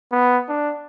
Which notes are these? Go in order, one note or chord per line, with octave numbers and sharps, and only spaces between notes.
B3
D4